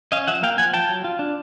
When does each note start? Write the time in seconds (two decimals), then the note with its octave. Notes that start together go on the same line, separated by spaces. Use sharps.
0.12 C#4 D#5 F5
0.27 F3 E5 F#5
0.43 A#3 F5 G5
0.58 F3 F#5 G#5
0.74 F4 G5 A5
0.89 F#3
1.04 F4
1.19 D4